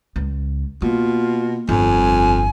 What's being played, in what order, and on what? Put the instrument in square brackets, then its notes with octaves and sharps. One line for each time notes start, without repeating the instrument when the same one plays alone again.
[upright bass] C#2
[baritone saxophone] B2 [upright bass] A#3 [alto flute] F4
[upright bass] G1 [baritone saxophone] F2 [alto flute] G#5